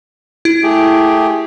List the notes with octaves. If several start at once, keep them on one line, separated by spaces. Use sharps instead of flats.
E4
A3 G4 G#4